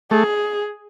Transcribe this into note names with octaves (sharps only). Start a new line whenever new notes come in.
A3 G#4